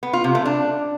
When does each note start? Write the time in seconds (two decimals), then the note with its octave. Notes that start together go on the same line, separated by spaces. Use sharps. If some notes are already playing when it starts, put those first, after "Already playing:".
0.03 B3
0.13 F4
0.24 C3
0.35 A3
0.46 D4